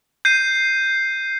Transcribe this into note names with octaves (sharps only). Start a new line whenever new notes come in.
G6 C7 D#7